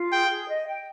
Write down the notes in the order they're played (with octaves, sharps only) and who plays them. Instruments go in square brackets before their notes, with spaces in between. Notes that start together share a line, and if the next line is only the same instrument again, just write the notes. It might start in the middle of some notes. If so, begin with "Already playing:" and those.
Already playing: [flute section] F4
[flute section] G#4 [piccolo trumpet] G5
[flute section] G#4
D#5
G5